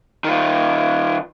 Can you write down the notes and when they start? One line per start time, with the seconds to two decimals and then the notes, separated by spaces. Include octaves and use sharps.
0.24 D#3 F4